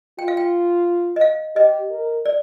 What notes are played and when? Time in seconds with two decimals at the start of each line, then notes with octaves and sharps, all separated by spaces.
0.19 F4 G5
0.28 F5
0.37 G5
1.16 D#5
1.21 F5
1.56 G4 D#5
1.90 A#4
2.26 D5